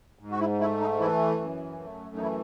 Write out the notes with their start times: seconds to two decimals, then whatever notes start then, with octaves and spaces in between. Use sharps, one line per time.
0.19 G#2
0.31 F#4
0.40 E4
0.60 A3 E4
0.81 D#4
1.00 E3 E4
1.40 F#2
1.80 A3
2.16 D#4
2.20 E3 E4